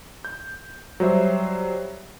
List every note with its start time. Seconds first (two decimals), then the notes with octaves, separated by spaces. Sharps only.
0.25 G6
1.00 F#3 G3 C5 E5